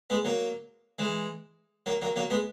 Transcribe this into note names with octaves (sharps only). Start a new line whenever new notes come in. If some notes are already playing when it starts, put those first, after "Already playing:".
G#3 B3
F#3 A#3
E3 G#3
F#3 A#3
F#3 A#3
F#3 A#3
G#3 B3